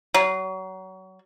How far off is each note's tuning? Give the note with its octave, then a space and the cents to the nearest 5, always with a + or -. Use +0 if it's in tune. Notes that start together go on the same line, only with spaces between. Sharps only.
F#3 +30